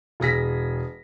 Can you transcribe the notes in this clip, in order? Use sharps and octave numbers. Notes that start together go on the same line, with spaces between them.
E1 G#4 A#6 B6